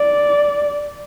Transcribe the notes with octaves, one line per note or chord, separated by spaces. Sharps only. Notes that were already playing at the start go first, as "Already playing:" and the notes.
Already playing: D5